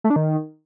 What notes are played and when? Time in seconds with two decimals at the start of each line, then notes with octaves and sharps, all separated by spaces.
0.04 A3
0.10 D4
0.16 D#3